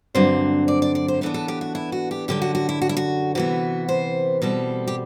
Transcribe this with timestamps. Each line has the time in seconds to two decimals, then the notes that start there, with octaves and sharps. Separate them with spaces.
0.15 G2 D3 F#3 C4 C5
0.68 D5
0.82 D5
0.95 D5
1.08 C5
1.21 A2 E3 B3 D4 A4
1.34 A4
1.48 G4
1.61 F#4
1.75 E4
1.92 F#4
2.11 G4
2.28 F#2 D3 G3 G4
2.42 F#4
2.55 F#4
2.69 E4
2.82 F#4
2.89 E4
2.97 F#4
3.35 C3 E3 B3 F#4
3.89 C5
4.42 B2 G3 C4 A4
4.87 G4